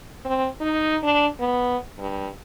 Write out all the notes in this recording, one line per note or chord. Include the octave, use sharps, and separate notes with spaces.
C4
D#4
D4
B3
G2